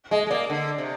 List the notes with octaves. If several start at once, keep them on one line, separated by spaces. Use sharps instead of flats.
G#3 D#5
G#3
A#3 D5
D3
C3